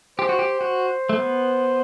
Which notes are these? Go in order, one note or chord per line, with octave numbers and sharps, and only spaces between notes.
G4 C5
F#4
G4
F#4
A3
B3